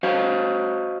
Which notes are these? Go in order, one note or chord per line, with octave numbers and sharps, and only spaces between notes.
F#4 C5 D#5 F5